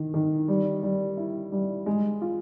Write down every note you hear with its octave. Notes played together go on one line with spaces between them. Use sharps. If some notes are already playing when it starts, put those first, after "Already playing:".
Already playing: D#3
D#3
G3
G3
E4
G3
G#3
F4